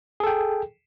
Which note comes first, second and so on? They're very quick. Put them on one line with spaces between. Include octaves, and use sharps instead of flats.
G#4 A4 G5